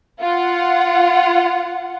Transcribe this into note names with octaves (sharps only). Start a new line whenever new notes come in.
F4 F#5